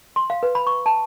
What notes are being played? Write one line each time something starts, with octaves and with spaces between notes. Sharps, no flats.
C6
F5
B4
B5
C#6
A5